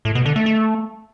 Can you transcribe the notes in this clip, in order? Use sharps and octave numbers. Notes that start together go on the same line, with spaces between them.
A2
B2
D3
A3
A3